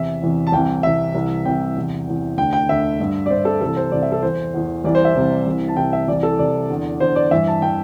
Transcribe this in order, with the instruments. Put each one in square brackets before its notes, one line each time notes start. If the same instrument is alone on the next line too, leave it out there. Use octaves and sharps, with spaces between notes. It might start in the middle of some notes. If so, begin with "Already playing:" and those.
Already playing: [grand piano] E2 C3 E3 E5
E2 C3 E3
A5
C2 C3 E3 G5
C2 C3 E3 E5
C2 C3 E3
C2 C3 E3 G5
E2 C3 E3
E2 C3 E3
D2 D3 G5
G5
D2 D3 E5
G2 D3
D5
G2 D3 C5
A4
C2 C3 E3 A4
C5
C2 C3 E3 D5
E5
A4
E2 E3 C5
E2 E3
C2 C3 E3 D5
C5
E5
C2 C3 E3
C2 C3 E3
A5
C2 C3 E3 G5
E5
C2 C3 E3 D5
A4
C2 C3 E3 D5
E2 D3
E2 D3 C5
D5
G2 E3 E5
A5
E3 G5